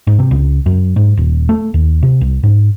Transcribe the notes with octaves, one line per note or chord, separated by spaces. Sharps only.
G#2
C3
C#2
F#2
G#2
D#1
A3
D#2
C3
C2
G#2